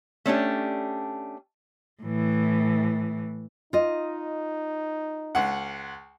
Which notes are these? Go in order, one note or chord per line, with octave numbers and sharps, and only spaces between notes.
A3 C#4 D4 G4
A2 E3
D#4 F4 D#5
C#2 F#5